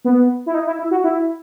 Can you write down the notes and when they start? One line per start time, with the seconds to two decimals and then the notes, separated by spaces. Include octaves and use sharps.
0.05 B3
0.46 E4
0.54 D#4
0.67 E4
0.79 E4
0.91 F#4
1.04 E4